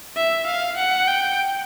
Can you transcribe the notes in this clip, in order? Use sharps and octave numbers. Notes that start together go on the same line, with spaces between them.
E5
F5
F#5
G5